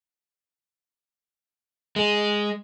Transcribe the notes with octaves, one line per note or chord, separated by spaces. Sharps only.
G#3